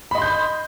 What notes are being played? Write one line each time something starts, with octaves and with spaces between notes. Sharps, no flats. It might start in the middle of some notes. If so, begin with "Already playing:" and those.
D#5 B5 C6 G6